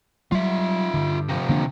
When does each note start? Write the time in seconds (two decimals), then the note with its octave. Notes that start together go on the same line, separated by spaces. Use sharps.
0.32 F#3 G3 F4 E5
0.94 G2 D3
1.29 C3 F3
1.49 D3 A#3 D4